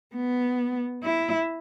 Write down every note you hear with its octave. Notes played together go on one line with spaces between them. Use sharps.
B3
E4